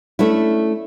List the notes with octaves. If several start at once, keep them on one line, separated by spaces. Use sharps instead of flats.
A3 C#4 D4 E4